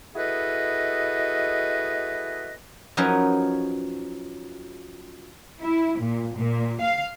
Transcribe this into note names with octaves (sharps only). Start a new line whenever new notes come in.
E4 F#4 G#4 A4 B4 D#5
F3 F#3 C#4 D#4 A#4 B4
E4
A#2
A#2
F5